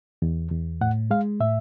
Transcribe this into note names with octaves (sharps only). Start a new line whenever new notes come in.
E2
E2
A2 F#5
G#3 F5
A2 E5